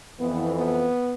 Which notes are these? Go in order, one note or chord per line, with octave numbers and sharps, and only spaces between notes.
F2 E3 B3
B3